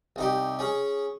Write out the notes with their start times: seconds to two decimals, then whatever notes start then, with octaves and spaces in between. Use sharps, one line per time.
0.16 C2 D#4 G4
0.59 C#4 G#4